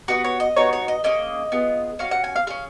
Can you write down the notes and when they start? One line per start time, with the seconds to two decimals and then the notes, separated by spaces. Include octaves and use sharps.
0.08 B3 D#4 F#4 B4
0.24 C#5
0.40 D#5
0.56 B3 D#4 F#4 C#5
0.73 C#5
0.88 D#5
1.04 A#3 C#4 G#4 D#5
1.52 B3 F4 G#4
1.99 C#4 F#4 F5
2.11 F#5
2.24 G#5
2.36 F5
2.47 C#4 G#4 F5